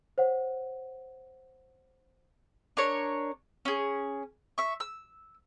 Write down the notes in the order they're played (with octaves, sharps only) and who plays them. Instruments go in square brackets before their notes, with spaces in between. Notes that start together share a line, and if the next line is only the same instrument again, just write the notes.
[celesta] C5 C#5 F#5
[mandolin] D4 A#4 C#5
C#4 G#4
E5 C#6
E6